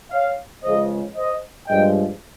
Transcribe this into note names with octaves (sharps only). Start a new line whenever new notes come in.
C#5 F5
C#2 C#3 F3 G#3 C5 D#5
C5 D#5
G2 F3 G#3 D#5 G5